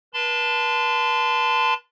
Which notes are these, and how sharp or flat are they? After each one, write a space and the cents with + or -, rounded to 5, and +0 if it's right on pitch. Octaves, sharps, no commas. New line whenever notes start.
B4 -40 A5 +0 C6 -30